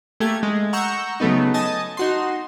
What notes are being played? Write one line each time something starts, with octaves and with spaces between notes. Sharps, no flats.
A3 A#3 G4 G#6
G#3
F#5 A#5 C#6 E6 G6
C#3 F#3 A3 B3 D#4
D#5 G#5 A5 D#6
D#4 F#4 C6